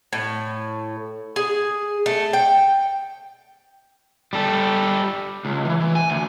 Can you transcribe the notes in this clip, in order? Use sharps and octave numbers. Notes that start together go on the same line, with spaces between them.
A2
G#4
A3
G5
G3 A4
C#2
E3
E3
G#5
D2